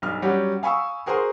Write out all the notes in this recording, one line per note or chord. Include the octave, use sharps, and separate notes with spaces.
B1 G2 F6
F#3 G3 C#4 F#4 G4
F5 G#5 B5 C#6 D#6 E6
F#4 G#4 A#4 C5 C6 D#6